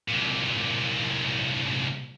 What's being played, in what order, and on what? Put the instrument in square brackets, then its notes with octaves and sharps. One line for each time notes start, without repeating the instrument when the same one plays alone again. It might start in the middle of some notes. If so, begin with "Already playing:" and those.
[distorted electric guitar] C2 A#2